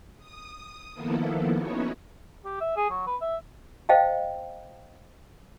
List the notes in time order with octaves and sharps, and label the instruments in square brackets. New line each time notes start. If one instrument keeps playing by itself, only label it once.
[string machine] D#6
D#3 F3 A#3 B3 E4 A4
B3 C#4 D#4 E4 F#4 C#5
[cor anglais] G4
E5
G#4
F#3
B4
E5
[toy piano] C5 D#5 F5 G5 A5